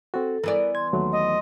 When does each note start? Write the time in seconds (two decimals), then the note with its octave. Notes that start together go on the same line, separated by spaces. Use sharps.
0.14 C4 F#4 A4
0.44 E3 B3 A#4 D5
0.75 C6 G#6
0.93 D#2 F#3 A3
1.12 D#5